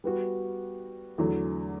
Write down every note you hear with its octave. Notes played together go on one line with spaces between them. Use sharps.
G3 B3 F#4
E2 D3 F#3 A3